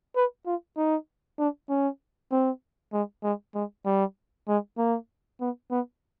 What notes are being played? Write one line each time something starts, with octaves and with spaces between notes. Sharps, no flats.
B4
F4
D#4
D4
C#4
C4
G#3
G#3
G#3
G3
G#3
A#3
B3
B3